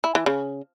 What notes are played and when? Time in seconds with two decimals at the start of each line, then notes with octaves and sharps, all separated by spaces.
0.04 E4
0.15 E3
0.26 C#3